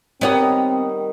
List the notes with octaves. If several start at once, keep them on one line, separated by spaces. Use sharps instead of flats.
D#3 G3 B3 C4 C#5 D#5